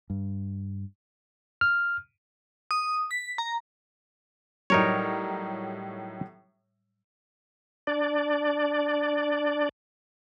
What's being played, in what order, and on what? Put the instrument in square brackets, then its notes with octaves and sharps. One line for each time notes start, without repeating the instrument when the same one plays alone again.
[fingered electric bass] G2
[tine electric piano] F6
[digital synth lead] D#6
B6
A#5
[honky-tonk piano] A2 F#3 G3 [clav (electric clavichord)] D#4 A#4 C#5
[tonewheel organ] D4 D5